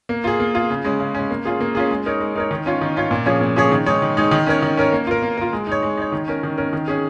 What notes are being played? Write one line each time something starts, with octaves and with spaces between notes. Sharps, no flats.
A#3
F4 G#4
A#3
F4 G#4
C#3
G#3 C#4
C#3
G#3 C#4
A#3
C#4 F4 G#4
A#3
C#4 F4 G#4
G#3
D#4 A#4 C#5
G#3
D#4 A#4 C#5
D#3
C#4 F4 C#5
D#3
C#4 F4 C#5
A#2
F3 C#4 G#4 C#5
A#2
F3 C#4 G#4 C#5
D#3
G#3 D#4 C#5
D#3
G#3 D#4 C#5
D#3
C#4 A#4 C#5
D#3
C#4 A#4 C#5
A#3
F4 A#4
A#3
F4 A#4
G#3
D#4 C#5
G#3
D#4 C#5
D#3
C#4 A#4
D#3
C#4 A#4
D#3
C#4 G#4